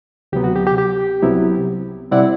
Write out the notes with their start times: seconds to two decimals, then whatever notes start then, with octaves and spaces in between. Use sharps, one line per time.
0.32 D2 C3 F#3 B3 G4
0.44 F#4
0.56 G4
0.67 G4
0.78 G4
1.22 C2 C3 F#3 B3 E4
2.11 C3 G3 C4 E4 D5 F#5